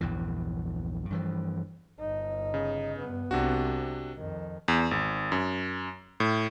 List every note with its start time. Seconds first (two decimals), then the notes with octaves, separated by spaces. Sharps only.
0.01 A#1 E2 G2 E3
1.10 G2 E3 F3
1.99 G1 D#4
2.54 C#3
2.99 G2 B3
3.31 C2 C3 D4 F#4
4.16 F2 D#3
4.68 E2
4.91 G#1
5.32 F#2
6.20 A2